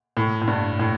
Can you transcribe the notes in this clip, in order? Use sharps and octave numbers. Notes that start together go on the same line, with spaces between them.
A2
A2
G2
A2